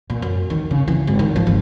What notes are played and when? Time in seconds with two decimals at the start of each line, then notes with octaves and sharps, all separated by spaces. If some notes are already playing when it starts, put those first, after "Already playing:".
0.10 A#2
0.22 F#2
0.50 D#3
0.71 C#3
0.88 E3
1.07 G#1
1.19 D#3
1.36 F3
1.47 G#1